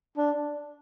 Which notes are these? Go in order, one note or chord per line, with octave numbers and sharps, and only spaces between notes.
D4